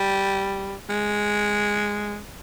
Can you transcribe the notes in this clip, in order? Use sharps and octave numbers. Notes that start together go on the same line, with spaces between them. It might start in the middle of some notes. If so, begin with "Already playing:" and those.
Already playing: G3
G#3